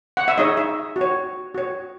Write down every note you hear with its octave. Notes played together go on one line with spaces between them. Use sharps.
F#5
E5
D#4 G#4 C#5 D#5
E5
F#4
C#5
F#4 C#5